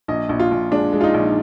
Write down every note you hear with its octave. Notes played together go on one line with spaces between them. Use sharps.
A#1 D#5
A#1
F4
A#1
G#3 D4
G#3
F4
D#4
A#1